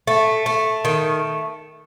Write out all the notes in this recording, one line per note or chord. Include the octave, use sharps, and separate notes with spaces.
A3
A3
D#3